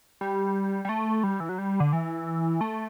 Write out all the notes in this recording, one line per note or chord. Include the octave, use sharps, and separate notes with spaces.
G3
G3
A3
G3
E3
F#3
G3
D3
E3
A3